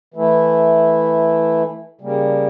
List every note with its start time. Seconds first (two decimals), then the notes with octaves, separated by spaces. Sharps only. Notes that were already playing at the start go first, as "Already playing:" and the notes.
0.14 E3 A3 E4
2.01 C#3 G3 A#3